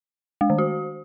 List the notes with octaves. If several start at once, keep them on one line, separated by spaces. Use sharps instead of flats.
G#3
D#3
F#4